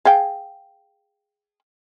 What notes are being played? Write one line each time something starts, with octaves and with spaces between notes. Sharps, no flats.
G#4 F5 G5